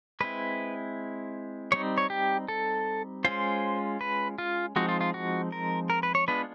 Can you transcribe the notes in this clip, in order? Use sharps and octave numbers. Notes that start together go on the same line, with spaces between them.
G#3 C4 E4 B4
G3 C4 D#4 C#5
C#5
G4
A4
G#3 C#4 F4 C5
B4
F4
F3 G#3 C4 D#4 F#4
F4
F4
F#4
A#4
A#4
B4
C#5
G#3 B3 D4 F4 B4